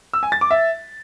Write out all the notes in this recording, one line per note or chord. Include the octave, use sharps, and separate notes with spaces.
E6
G#5
A6
D6
E5